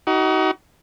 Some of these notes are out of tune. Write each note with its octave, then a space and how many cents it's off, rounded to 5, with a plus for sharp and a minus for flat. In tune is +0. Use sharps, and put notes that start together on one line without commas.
D#4 +25 F#4 +35